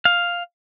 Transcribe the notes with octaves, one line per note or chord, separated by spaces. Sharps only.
F5